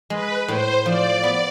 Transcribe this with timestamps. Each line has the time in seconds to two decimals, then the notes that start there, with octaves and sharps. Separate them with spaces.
0.10 G#3 B4
0.48 A2 C5
0.86 F3 D5
1.23 B3